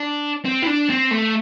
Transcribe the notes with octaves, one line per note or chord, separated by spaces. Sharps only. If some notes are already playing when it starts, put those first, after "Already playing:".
Already playing: D4
C4
E4
D4
C4
A3